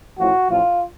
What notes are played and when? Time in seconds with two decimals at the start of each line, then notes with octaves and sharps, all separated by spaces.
0.18 A1 A2 F3 F#4
0.49 A1 A2 F3 F4